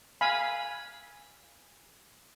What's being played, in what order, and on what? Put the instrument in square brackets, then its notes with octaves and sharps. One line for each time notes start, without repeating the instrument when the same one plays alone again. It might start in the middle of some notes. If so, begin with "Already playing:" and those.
[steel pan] F5 G#5 B5